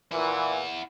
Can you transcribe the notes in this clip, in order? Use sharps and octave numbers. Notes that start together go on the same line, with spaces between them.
A#2 E3 E4 F#5